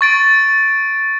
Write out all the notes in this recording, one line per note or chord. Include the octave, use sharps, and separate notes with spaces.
C#6 A6 D7